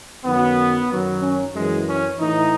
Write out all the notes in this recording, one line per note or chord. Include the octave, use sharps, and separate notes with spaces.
F#2 D#3 F#3 B3
F#2 D#3 F#3
C#4
F#2 E3 G#3
C#4
A2 E3 D#4